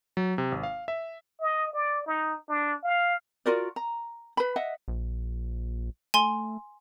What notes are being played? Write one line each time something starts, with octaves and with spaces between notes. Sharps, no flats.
F#3
C3
G#1
F5
E5
D#5
D5
D#4
D4
F5
F4 F#4 A#4 D5
A#5
B4 B5
D#5 E5 F#5
A#1
A3 G#5 C6